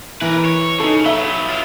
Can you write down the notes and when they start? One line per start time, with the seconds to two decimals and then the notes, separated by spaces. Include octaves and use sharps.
0.21 E3 A#4 B4
0.45 C#5
0.80 C#3 D#4 A4
1.06 F#3 B3 E5
1.49 E4 F4